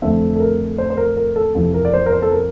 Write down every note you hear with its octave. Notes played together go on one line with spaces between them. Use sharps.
F2 D3 A3 C4 E5
A4
A#4
C5
C5
A#4
A#4
A4
F2 C3 E3 A4
A#4
D5
C5
A#4
C5
A4
A#4